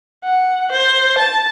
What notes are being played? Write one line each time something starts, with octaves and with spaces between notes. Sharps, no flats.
F#5
C5
A5